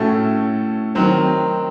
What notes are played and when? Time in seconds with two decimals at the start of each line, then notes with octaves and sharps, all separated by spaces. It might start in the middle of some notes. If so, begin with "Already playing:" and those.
Already playing: A2 A3 C#4 F#4 A4
0.95 D#3 F#3 C4